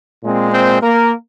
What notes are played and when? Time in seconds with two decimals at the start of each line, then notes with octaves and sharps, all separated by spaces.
0.23 A#2 G#3 C4
0.52 C4 C5
0.82 A#3 A#4